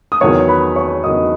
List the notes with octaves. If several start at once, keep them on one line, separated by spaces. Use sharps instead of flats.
D#6
E2 D#3 F#3 C#5 C#6
B4 B5
C#5 C#6
E2 D#3 F#3 D#5 D#6